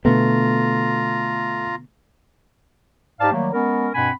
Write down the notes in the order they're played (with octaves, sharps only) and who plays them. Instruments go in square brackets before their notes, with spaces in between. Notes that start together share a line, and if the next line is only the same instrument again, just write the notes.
[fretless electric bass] B2 D3 B3 [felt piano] A3 [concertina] F4 A#5
[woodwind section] G#2 D#4 G4 D5 F5 A5
D#3 F#3 G3 A3 A#3
G#3 B3 C#4 A#4
G2 B2 C4 F#5 G#5 B5